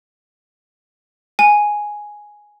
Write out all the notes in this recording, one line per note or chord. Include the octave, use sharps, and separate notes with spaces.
G#5